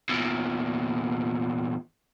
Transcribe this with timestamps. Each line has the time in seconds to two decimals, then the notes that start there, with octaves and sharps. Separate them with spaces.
0.09 E2 A#2